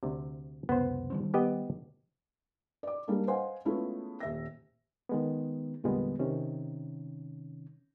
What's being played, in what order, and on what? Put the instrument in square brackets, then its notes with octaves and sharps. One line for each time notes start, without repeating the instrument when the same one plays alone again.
[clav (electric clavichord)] D2 C3
[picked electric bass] C#2 F#2 C3 [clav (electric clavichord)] B3 C5
[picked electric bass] D#3 G3 C4
[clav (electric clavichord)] B3 G4 D#5
[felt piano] D5 D6
G3 G#3 A#3 D4
C5 D#5 F5 F#5 G#5 C6
G#3 A3 B3 C#4 E4 F4
D#1 E5 A#6
[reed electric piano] D#3 G#3 B3
E2 A#2 D3 G3 G#3 B3
C3 D#3 C#4